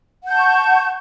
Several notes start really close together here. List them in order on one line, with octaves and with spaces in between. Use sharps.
F#5 G6 A5 C#6